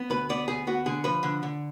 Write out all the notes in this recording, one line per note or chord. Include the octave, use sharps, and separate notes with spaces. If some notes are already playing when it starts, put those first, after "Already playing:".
Already playing: B3
D2 B4
B3 D5
D2 G#4
B3 F#4
D3 G#4
F3 B4
D3
D3